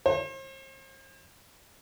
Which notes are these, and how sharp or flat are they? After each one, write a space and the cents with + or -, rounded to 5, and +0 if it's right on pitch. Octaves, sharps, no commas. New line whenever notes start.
C5 +40